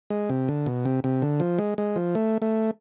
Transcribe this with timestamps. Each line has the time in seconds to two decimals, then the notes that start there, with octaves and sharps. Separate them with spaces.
0.10 G#3
0.30 C3
0.49 D3
0.66 B2
0.85 C3
1.04 C3
1.22 D3
1.40 F3
1.59 G#3
1.78 G#3
1.96 F3
2.15 A3
2.42 A3